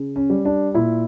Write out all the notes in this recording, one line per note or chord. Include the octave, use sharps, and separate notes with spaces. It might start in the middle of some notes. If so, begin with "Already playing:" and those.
Already playing: C#3
C#4
G3
D4
A#2 E4